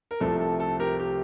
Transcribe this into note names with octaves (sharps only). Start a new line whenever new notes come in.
A#4
C2 C3 F3 A3 A4
A4
A4
G4 A#4
G4